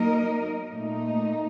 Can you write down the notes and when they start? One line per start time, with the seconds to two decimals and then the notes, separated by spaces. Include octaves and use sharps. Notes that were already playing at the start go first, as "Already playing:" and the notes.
Already playing: F#3 A#3 D#4 A#4 D#5
0.70 A#2 A3 D#4